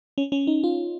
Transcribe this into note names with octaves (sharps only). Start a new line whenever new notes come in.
C#4
C#4
D#4
F4